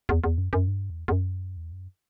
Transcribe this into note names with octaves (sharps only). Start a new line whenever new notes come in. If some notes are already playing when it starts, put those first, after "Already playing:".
E2
E2
F#2
F#2
G2
E2
E2
F#2
E2
F#2